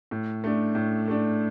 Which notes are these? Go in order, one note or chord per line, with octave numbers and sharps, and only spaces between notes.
A2
A3 D4
A2
A3 D4